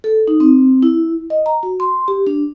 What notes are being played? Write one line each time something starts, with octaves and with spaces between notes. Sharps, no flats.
A4
D#4
C4
E4
D#5
A#5
F#4
C6
G4
D4